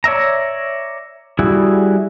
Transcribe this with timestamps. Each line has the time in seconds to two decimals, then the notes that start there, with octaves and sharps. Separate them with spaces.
0.04 C#5 D5 E5 A#5
1.39 G3 E4 F#4 G#4